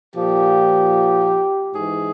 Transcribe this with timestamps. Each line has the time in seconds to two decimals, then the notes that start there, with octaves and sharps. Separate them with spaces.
0.14 A#2 F3 G4
1.74 G#2 E3 G#4